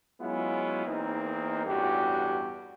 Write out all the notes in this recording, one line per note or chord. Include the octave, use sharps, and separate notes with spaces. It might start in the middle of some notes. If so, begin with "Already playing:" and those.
F#3 G#3 B3 C#4 E4 F4
E2 A#3 C4 D#4
A1 E2 G2 F#4 G4